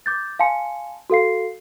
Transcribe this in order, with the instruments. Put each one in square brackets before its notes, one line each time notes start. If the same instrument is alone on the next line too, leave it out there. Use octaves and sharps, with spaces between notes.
[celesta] D6 G6 A6
F5 G#5 A5 C6 C#7
F#4 A4 F5 C7